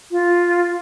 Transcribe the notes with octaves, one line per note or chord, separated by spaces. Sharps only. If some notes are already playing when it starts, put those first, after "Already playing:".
F4